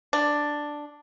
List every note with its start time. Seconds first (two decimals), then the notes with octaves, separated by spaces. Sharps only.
0.13 D4